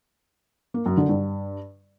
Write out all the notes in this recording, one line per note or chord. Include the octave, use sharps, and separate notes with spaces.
A#3
F#2
D3
G2